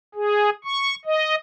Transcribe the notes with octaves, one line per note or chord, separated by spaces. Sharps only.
G#4
C#6
D#5